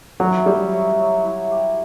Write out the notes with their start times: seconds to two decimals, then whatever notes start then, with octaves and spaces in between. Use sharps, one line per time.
0.20 F#3 A3
0.46 G3 E4
0.72 F#3
0.99 F#3
1.24 E4
1.51 G4